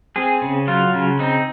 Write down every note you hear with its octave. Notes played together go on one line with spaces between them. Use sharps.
C4 G#4
C#3
F#3 F4
C#3
C4 D#4